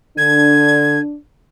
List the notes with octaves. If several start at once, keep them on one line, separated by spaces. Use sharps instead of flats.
D3 D4 G#6